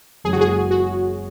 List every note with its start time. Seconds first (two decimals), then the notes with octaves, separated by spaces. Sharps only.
0.24 F#1 F#2 C#3 E3 G#3 G#4
0.33 F#4
0.41 G#4
0.71 F#4